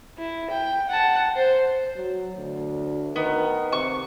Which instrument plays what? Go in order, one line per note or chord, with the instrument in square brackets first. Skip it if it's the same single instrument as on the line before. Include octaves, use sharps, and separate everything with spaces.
[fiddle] E4
G5
F#5 A5
C5
[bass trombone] F#3
D2
[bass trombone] D#3 [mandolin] B3
[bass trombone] C3 [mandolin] C#6